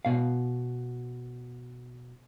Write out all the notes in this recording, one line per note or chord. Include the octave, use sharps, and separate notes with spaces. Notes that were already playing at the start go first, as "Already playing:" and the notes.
B2 F5